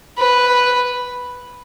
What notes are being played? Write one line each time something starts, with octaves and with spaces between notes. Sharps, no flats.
B4